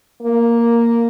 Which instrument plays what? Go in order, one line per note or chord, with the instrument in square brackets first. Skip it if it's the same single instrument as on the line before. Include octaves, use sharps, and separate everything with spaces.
[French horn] A#3